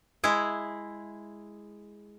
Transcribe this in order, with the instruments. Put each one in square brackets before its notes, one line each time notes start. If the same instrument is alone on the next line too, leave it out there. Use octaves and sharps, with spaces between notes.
[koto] G#3 E4 G#4